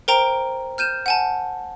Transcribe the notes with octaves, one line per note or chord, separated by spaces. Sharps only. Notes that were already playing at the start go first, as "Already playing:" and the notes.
A#4 C5 G5 A#5 D7
F6 G6 D#7 E7
F#5 G#5 A5